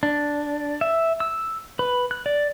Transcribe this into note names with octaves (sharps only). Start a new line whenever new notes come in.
D4
E5
E6
B4
F#6
D5